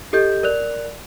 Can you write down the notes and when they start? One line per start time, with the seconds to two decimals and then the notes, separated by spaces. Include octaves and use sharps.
0.13 G4 A4 D#5 G6
0.43 A#4 D5 F#6 F7